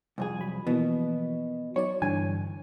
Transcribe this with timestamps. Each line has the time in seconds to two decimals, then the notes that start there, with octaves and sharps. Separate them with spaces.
0.18 C2 F2 G#4
0.40 F#3 B5
0.67 B2 E3 F3 A#3
1.76 F#3 D#4 C#5 D5
2.02 G2 D3 E3 G#5